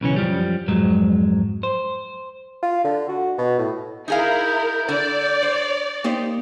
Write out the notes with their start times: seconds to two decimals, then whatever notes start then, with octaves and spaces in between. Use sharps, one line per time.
0.01 B1 C#3 E3 C#4
0.16 F#2 F3 G3
0.68 F2 G#2 F#3 G#3
1.63 C5
2.63 F4
2.84 D3
3.08 F#4
3.38 B2
3.58 A2
4.08 D#4 E4 G#4 A#4 F5 G6
4.89 D3 D5
5.43 C5
6.04 A#3 D#4 G4 C5